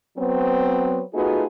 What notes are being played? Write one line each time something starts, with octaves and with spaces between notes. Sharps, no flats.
F#3 B3 C4
A3 B3 D#4 F4 F#4 G#4